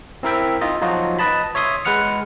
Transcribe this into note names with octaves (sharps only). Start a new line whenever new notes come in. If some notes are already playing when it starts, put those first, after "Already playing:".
C4 E4 A#4 E5 G5
D#4 F4 D#5
F3 F#3 D#4 F4 F#4
B4 D#5 A5 B5
C#5 E5 C6 D#6
G#3 B4 F#5 F6 C#7